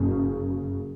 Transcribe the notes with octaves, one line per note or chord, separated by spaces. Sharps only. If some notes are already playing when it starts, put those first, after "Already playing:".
Already playing: F#1 F#2 C#3